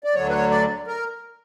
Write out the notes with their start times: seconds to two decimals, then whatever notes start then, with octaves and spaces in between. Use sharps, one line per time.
0.04 D5
0.15 D2 D3 F#3 C#5
0.29 B4
0.33 C#5
0.51 D5
0.87 A#4